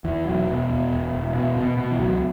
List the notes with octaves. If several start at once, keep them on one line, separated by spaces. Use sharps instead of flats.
E2 E3
E1 F#3
B2
E2
E1
E1
B2
B2
B2
E3
C#2 F#3